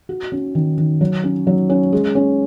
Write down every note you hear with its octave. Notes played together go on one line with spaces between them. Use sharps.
F#4
C#4
D#3
D#3
F#3
C#4
F#3
C#4
G#3
C#4